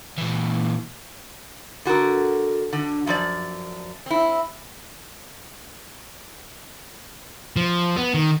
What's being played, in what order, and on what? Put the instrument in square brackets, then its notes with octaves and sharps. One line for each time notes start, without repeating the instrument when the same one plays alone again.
[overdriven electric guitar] A#2 E3
[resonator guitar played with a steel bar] D3 F#4 A4 A#4
D3
F#2 F3 D5
C4 E4
[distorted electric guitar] F3
B3
D#3